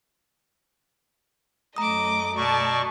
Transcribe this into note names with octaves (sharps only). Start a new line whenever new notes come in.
F#2 A3 D#5 A#5 D6 D#6
B2 D5 A5 C#6